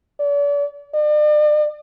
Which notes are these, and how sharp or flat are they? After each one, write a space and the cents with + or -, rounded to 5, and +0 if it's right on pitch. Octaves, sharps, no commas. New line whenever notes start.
D5 -40
D5 +40